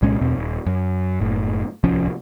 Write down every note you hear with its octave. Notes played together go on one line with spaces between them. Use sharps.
C2 A#2 G#3 C#4
E2 B2 C4
D#1
F#2
F#1 A2
D1 C2 F3 C#4